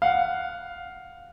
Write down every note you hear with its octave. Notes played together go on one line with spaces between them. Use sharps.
F5 F#5